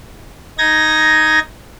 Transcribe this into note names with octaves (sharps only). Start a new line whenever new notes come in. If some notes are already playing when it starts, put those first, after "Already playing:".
D#4 G#6 A#6